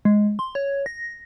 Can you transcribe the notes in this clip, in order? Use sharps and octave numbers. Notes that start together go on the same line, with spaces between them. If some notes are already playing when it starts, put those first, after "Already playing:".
G#3
C6
C#5
A#6